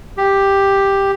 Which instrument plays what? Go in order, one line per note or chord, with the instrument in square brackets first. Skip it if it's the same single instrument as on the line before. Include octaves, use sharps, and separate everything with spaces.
[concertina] G4